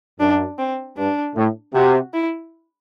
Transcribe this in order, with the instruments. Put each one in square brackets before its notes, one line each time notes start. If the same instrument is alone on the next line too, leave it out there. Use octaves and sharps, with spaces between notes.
[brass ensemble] F#2 [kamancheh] D4
[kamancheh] C4
[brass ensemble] G2 [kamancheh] D4
[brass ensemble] A2
[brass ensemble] C3 [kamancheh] F#4
[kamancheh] E4